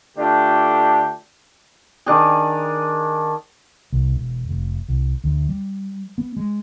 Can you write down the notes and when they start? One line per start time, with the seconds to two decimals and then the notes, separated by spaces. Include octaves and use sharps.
0.17 D3 A3 D4 F4 G4
2.06 D#3 D4 G#4
3.93 C2
4.14 E1
4.49 F1
4.88 C2
5.24 D2
5.49 G3
6.18 B3
6.37 G#3